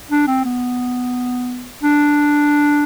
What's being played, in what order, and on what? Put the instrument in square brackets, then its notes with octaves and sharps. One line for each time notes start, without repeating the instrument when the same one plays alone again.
[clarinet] D4
C4
B3
D4